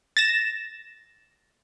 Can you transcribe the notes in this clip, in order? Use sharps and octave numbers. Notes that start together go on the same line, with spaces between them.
A6 A#6 E7